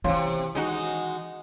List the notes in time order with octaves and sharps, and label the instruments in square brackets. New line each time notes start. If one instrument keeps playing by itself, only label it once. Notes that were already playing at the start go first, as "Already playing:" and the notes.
[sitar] F#2 C3 [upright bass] D#3 E3 [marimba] C#5 F5 C6
[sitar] G#3 D#4 F#4